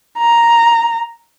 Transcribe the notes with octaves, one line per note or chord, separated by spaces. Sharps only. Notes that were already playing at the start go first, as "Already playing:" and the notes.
A#5